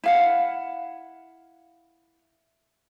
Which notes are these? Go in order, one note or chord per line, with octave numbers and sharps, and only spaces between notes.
E4 F5 F#5